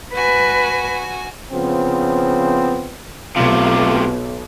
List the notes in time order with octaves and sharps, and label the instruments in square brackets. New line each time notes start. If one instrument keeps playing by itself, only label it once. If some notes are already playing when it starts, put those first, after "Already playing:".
[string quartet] F#4 G#5 [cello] B4
[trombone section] C#3 F3 B3 C4
[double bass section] B1 [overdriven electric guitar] A2 C3 [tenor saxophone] F4